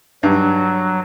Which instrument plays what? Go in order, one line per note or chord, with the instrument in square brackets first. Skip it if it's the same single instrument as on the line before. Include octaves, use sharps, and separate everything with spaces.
[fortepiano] G2 [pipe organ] F#3